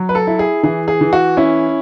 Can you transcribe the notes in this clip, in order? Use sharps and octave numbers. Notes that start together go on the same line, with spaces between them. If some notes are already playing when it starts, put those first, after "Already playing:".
Already playing: F#3
B4
A4
E4
G#4
E3 G#4
G#4
E3
F#4
C#4 E4